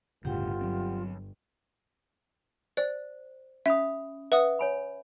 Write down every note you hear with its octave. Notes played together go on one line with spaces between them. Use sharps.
G1 D2 A2 C#3 F4 G4 F#5 G5
F#3 C4
C5 D5
C#4 E5 B5 D#6
B4 E5 F#5 D#6
C#5 G#5 B5